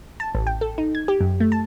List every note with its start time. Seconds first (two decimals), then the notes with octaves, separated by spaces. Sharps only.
0.20 A5
0.35 A1
0.47 G5
0.61 A4
0.78 D#4
0.95 G#6
1.08 G4
1.21 F#2
1.40 A3
1.52 A5